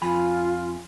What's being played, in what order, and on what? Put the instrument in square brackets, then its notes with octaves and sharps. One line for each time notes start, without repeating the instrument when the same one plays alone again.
[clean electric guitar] F2 G#5 B5 [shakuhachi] F4